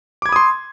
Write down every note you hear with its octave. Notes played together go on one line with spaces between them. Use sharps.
B5 C6 D6 D#6 G#6